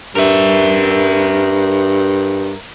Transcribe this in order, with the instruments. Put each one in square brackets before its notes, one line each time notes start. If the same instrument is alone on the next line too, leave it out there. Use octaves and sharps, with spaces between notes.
[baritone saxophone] G2 [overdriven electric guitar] A#4 E5